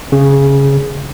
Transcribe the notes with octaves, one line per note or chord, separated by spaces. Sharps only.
C#3